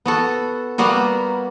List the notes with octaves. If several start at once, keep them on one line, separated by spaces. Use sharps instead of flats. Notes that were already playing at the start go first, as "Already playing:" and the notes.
B3 F#4 A4
G3 A#3 B3 F#4